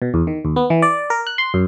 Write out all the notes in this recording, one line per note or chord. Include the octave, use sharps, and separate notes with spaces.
B2
E2
D#3
D#2
B3
E3
D5
A#4
F#6
C6
F#2